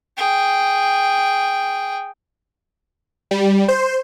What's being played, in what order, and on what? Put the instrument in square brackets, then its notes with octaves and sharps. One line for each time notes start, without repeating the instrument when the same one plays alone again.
[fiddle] G#4 G5
[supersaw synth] G3
C5